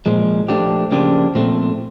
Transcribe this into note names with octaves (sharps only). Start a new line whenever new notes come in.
A#2 F3 G#3
F3 A3 D4 G4
C#3 F3 A#3 D4 G4
A#2 F3 A3 C4